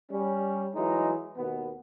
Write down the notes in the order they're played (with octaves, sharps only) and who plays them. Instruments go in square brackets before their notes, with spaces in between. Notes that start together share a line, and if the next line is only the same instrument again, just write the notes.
[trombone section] G3 C#4
E3 F#3 G#3 D#4
D#2 B2 B3